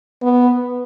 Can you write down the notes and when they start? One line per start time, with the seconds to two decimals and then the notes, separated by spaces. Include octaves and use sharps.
0.23 B3